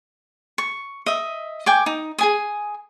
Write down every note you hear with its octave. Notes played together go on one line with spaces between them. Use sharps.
C#6
D#5 E5
G5 G#5 D6
D#4
G#4 G#5 D#6